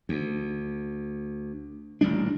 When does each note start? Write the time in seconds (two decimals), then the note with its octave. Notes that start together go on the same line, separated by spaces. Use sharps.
0.09 D2
2.01 D#1 A1 G3 D4